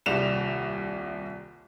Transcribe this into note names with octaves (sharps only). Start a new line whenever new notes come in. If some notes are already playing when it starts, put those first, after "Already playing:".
D#1 C2 G3 E7 F7